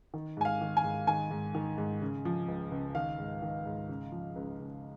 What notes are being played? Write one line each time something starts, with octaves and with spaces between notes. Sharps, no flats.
D#3
G#2 G#5
F5
D#3
G#5
G#2
D#3 G#5
G#2
D#3
G#2
C#3
F3
C#2
C#2
D#3 F5
G#2
D#3
G#2
C#3
F3
C#2
C#2